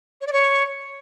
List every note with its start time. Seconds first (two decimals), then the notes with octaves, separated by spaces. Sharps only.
0.21 C#5
0.27 D5
0.33 C#5